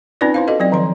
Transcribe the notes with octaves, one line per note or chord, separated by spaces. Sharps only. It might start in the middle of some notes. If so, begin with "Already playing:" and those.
C4 C#4 D#4 F4 B4 D5
E4 C5 F5
F#4 A4 D#5
F#3 C4 D5
D#3 F3 C6